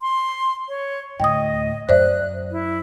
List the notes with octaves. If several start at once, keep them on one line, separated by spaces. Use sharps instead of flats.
C6
C#5
D2 A2 D#5 G5 D#6
F#2 C5 D5 E5 F#6
E4